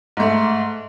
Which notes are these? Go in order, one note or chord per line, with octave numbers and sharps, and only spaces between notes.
G#2 A3